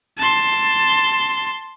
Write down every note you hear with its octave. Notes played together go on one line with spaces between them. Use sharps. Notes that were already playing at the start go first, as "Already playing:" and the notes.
A5 C6